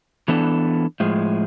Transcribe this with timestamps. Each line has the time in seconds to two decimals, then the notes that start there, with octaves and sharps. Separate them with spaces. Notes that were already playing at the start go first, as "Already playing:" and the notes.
0.28 E3 B3 D4 A4
1.00 A2 F3 G#3